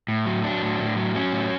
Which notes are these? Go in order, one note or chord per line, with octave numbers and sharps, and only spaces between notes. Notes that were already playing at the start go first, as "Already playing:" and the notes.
A2
F#3
F#3 D4
A2
A2
F#3
F#3 C#4
A2